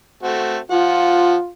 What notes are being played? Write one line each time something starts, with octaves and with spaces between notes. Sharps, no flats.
A3 C4 F#4
F3 F4 F#5